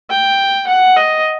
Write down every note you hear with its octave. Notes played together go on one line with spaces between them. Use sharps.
G5
F#5
D#5